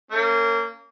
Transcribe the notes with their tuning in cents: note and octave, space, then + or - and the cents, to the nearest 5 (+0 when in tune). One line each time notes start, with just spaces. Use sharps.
A#3 -25 C#4 +0